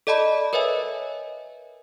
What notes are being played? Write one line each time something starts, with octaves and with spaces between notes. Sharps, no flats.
A4 D5 D#5 A5 B5
A#4 B4 C#5 D#5 E5 G#5